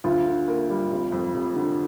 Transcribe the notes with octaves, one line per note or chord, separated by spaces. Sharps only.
D2 F4
D3
A#3
G3
F1
F2
F1
D3